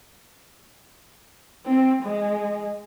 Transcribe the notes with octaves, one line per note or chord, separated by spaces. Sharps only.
C4
G#3